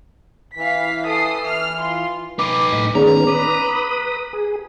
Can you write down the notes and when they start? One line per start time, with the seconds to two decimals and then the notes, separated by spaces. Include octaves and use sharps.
0.56 E3 F5 B6
1.06 A4 D#6 C7
1.45 F6
1.79 F4 C6
2.39 D#4 B4 D6
2.73 A2 D#5 B5
2.95 D#3 B3 C#4 G#4 D5 A#5
3.27 B4 B5 D6 D#6
4.33 G#4